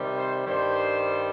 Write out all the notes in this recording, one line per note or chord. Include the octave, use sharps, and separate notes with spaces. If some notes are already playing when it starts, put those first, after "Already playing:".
Already playing: C3 D#3 G3
C5
G2 D#3 G3 C5